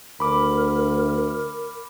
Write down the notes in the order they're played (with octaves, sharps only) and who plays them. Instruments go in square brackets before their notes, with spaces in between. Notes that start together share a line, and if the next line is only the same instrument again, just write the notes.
[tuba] D2 [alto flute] A#4 [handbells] B5 D6